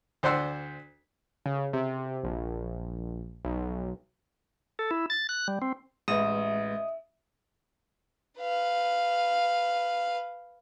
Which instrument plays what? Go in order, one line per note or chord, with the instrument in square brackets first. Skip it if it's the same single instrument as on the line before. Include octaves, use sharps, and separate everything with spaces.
[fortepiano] D2 C5 D5 F#5 C6 E6
[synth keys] C#3
C3
A#1
B1
[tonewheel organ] A4
E4
A6
F#6
G3
C4
[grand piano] A1 [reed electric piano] G#3 B4 [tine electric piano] D#5 D#6 [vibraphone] E5
[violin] B4 F5